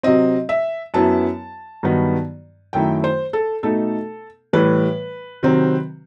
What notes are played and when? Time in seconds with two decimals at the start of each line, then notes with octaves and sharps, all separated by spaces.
0.03 C3 F#3 C4 D#5
0.49 E5
0.94 F#2 F#3 B3 E4 A5
1.83 G2 D#3 F#3 B3 D#4
2.73 F#2 D#3 A3 E4 G5
3.04 C5
3.33 A4
3.63 B2 A3 D#4 A4
4.53 A2 E3 G3 B4
5.43 C3 D#3 F#3 C4